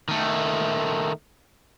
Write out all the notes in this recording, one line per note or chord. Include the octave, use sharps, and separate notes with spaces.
D#3 A3